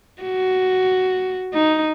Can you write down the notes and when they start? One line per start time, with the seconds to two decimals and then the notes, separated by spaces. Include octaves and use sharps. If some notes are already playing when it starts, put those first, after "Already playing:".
0.22 F#4
1.54 D#4